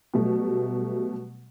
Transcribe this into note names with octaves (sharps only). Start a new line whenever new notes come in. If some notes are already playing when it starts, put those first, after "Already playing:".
B2 F#3 G3 A3